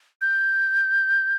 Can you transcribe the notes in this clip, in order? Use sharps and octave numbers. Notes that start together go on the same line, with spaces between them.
G6